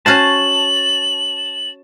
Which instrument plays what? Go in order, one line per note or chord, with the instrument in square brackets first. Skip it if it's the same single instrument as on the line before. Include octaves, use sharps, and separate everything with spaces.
[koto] C#4 F#4 C5 [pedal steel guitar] A5 [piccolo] F#7